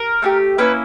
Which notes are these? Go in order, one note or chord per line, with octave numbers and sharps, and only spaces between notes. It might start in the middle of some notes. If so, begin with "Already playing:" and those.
Already playing: A#4
A3 D4 G4
A#3 C#4 E4 B4